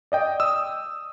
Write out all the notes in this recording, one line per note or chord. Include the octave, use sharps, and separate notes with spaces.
D5 D#5 G5
D#6 E6